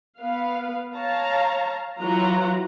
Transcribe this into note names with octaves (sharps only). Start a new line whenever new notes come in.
B3 B4 F5
C#5 F5 A5 A#5
E3 F#3 F4 F#4 A#5